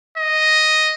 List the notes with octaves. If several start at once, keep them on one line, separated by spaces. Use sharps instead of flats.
D#5